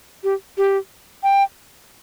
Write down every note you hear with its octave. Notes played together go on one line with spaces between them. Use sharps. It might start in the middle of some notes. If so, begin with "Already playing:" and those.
G4
G4
G5